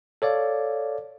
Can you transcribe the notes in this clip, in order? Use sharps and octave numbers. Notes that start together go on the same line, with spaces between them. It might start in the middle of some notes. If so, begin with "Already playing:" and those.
A4 C#5 D5 F5